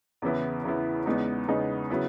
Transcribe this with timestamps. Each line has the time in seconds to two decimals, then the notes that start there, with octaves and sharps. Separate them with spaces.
0.22 E2 C#3 E3 B3 E4
0.64 E2 C#3 E3 B3 E4
1.06 E2 C#3 G#3 B3 D#4
1.48 E2 C#3 G#3 B3 D#4
1.90 C#3 F#3 B3 E4